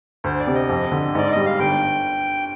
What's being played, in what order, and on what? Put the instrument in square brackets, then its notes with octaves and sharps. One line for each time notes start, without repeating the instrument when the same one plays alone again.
[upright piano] D2 [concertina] C5
[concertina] D5
[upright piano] C3
[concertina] D#5
[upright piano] F2
D3
[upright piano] G#2 [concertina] D5
[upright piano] G3 [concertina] D#5
[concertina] F5
[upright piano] G1 [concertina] G5